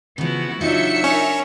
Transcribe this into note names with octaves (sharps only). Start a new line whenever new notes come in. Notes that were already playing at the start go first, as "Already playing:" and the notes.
C#3 F3 B3 E4 F#4
C#3 F#3 D4 D#4 F4 F#4 E5 C#7
C#4 D4 A#4